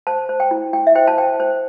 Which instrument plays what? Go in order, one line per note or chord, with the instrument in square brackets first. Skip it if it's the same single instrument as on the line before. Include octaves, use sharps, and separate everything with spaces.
[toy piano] C5 A5
C5
G5
E4
E4 G5
E5
C5 G5
A5
C5 G5
C5